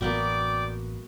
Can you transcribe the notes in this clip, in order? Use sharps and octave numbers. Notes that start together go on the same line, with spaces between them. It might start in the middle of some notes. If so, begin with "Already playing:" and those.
A1 F#2 A#3 B3 F#4 D5 G5 D6